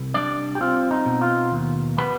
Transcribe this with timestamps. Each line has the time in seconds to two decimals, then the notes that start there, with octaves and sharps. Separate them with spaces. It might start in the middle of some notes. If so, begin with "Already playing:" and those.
Already playing: C2
0.14 G3 D4 D5
0.55 G4
0.61 C4 F4
0.91 D#4
1.06 B2
1.22 F4
1.52 D#2
1.98 G3 B3 B4